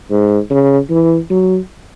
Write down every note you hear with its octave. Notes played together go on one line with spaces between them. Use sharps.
G#2
C#3
E3
F#3